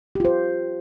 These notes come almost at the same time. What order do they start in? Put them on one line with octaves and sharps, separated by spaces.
G4 F4 C5